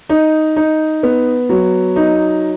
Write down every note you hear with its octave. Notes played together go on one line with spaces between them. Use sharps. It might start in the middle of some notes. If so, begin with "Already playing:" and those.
D#4
D#4
B3
F#3
D#4